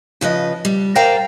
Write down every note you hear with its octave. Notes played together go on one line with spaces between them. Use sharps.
C#3 F3 B4 D#5
G3
A#4 C5 D5 F5 G5 A#5